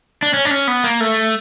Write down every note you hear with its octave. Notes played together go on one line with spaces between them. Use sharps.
D4
C#4
D4
C#4
B3
A#3
A3